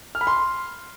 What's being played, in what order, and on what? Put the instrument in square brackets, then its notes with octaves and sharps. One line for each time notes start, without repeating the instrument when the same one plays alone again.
[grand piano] F6
B5
C6